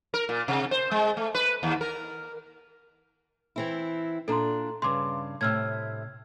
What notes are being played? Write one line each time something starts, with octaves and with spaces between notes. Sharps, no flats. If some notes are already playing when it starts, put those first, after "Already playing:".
A#4
A#2
C3
C5
G#3
A3
B4
D#2
A#4
E3 C4 E4
A#2 D4 A4 A#5 C6
G2 C#3 C6 D6
A2 C3 E6 F6 G#6